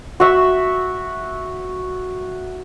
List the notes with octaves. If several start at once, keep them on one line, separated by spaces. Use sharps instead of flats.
F#4 E5